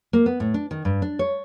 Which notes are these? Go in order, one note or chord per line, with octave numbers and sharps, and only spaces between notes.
A#3
B3
A2
D4
D#3
G2
D4
C#5